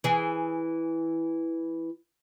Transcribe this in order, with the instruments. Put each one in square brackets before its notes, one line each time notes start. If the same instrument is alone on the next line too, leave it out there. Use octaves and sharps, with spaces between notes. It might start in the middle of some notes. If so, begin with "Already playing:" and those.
[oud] E3 G#4